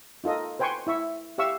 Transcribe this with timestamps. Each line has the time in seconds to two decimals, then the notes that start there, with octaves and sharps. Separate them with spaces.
0.24 D#4 F4 A4 D#5
0.59 B4 C5 G5 G#5 C6 C#6
0.87 E4 E5 C#6
1.38 G4 E5 F5 C#6 E6